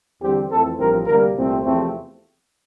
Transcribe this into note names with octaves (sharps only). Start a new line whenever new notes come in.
E2 D3 G3 C4 G4
F2 E3 A3 C4 A4
A1 G2 F3 C4 A#4
D2 C3 G3 A#3 A#4
C2 A#2 A3 C4
E2 C3 F3 A3 C4